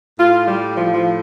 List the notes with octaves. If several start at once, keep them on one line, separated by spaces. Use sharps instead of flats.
A2 F4
G3
F3
F3